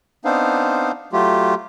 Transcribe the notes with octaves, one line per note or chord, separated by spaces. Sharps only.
B3 C4 D4 D#4 C5 F5
F#3 A3 F4 G4